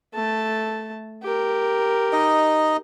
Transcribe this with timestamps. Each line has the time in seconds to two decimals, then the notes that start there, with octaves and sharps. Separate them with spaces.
0.14 A3 A5
1.23 G4 A#4
2.13 D#4 D#5